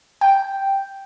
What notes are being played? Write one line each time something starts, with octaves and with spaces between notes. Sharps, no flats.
G5